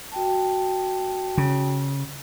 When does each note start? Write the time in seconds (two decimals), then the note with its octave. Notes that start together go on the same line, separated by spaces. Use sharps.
0.12 F#4 G5 A5
1.38 C#3